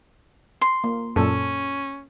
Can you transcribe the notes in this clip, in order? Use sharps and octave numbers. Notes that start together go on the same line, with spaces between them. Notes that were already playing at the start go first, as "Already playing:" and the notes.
C6
A#3
F#2 A#2 C#4 A4